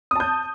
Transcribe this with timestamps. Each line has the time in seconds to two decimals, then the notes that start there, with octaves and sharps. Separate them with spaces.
0.11 D#6
0.16 A5
0.20 G6